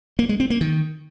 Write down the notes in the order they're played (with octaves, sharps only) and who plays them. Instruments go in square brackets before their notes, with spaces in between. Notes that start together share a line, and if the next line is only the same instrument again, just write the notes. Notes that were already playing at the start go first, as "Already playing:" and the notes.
[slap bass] A#3
G#3
C4
A#3
D#3